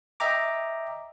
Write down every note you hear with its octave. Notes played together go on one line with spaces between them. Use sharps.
D#5 E5 G5 A#5 D6